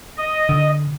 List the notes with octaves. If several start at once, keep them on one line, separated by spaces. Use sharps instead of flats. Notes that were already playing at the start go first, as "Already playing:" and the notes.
D#5
D3